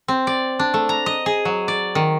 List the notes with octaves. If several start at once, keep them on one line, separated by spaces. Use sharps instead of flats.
C4
D5
D4
A3
A#5
D#5
G#4
F#3
D5
D#3